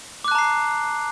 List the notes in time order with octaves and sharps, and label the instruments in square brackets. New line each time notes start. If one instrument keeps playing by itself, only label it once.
[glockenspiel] D6
F#6
A5
A#5
C7